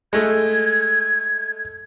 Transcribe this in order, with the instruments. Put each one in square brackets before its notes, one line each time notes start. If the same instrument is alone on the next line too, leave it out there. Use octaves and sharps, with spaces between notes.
[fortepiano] G#3 A3 [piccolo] G#6